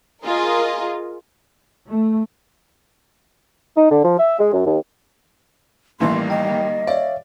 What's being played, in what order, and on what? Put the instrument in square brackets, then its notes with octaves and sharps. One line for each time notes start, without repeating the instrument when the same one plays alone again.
[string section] F4 G#4 A#4 D#5
[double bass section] A3
[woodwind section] D#4
D3
F3
E5
G#3
F#2
D#2
[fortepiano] A1 E3 [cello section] D#3 G3 A#3 [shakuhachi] C6
[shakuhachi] D#5 [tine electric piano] G5
[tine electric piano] C#5 E5 F5 [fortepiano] D5